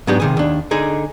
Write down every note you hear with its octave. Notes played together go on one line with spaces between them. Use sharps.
G#2 F#3 B3 D4 G4
C3 D#3 G#4
D#2 D4
D3 D#4 G#4